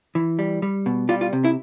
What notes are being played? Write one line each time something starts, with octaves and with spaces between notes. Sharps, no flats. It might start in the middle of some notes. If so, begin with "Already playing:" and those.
E3
G3
G3
B2
G3 F4
F4
C3
E4